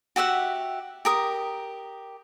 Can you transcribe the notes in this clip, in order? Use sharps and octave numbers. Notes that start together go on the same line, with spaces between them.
F#4 G4 E5 F#5
G4 A#4 D#6